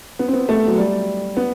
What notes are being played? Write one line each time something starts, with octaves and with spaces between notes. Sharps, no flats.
B3
C4
B3
A3
F#3
G3
B3